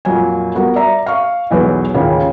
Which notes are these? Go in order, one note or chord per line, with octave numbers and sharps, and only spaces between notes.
F2 A#2 F#3 G#5
G3 B3 F#4 A#4
D5 E5 A#5
F5 C#6
B1 E2 F#3 B4
A1 D#2 A#2 C#3